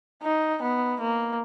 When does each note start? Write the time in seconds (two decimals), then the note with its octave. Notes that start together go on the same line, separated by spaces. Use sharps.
0.23 D#4
0.62 B3
1.00 A#3